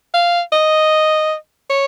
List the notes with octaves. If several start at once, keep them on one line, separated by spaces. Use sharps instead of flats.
F5
D#5
C#5